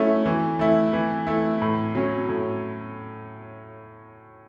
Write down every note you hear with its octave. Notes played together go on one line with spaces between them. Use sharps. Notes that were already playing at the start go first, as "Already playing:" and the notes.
Already playing: F#3 A3 C#4 E4
E3
A3 E4
E3
A3 E4
A2
F#3 C#4
A2